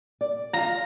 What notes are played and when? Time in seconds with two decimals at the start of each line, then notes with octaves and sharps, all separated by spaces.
0.21 D5
0.53 F4 F5 A#5